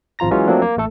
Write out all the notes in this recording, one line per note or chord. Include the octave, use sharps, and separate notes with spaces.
G#1 F3 F4 A#5 A#6
E3 F#3 G#3 C#4 F4
F3 F#3 A3 A#3 C4 D4
A#3
A1 A3 A4